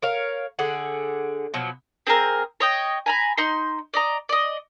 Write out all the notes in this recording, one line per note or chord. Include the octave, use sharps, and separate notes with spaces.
A#4 C#5 F5
D3 G#4 F#5
B2 F3 F#3
C4 G#4 A#4
C#5 D#5 G5
G#5 A#5 B5
D#4 C6
D5 D#5 A#5
D5 D#5